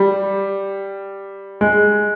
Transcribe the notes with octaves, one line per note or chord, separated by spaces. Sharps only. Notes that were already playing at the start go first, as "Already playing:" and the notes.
Already playing: G3
G#3